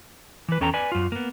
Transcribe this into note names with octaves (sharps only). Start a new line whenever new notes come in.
E3 B4
E2 C#4 A4 G5 A#5
B4 D5 G#5
F#2 F4
A#3 B3